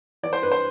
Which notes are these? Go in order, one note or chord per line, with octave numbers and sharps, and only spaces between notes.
E3 D5
C5
G2 B4
C5